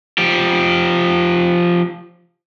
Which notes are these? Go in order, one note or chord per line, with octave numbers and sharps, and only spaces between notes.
F3 G4